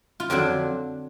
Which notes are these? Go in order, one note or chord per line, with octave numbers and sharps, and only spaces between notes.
F4
F2 D3 F#3 D4